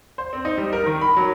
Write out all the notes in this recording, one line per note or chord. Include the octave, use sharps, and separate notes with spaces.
C5
C4
D#4
G3
A#4
D#3
B5
F#3